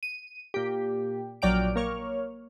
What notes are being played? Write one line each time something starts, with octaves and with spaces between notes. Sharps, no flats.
D#7
A#2 G4
A#1 F#3 D5 G5 F6 D7
A#3 C#5 F6